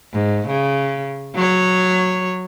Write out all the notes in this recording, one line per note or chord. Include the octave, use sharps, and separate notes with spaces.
G#2
C#3
F#3 C#5